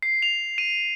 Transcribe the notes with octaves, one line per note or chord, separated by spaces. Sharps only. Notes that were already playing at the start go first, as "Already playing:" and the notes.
C7
F7
D#7